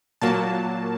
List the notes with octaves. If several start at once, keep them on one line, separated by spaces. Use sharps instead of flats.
A#2 F#3 A#3 A5